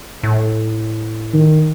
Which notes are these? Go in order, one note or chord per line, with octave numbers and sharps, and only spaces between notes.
A2
D#3